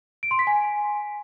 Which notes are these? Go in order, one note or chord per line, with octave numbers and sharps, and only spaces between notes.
D7
C6
B6
G#5